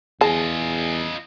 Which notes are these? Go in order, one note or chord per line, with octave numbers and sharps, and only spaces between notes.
E2 F4 G#4 D#5 A5